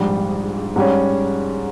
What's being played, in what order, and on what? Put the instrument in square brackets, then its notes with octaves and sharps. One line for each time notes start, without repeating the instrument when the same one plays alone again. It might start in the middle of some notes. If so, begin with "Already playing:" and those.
Already playing: [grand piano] A#1 G#2 G3
G#2 G3 C#4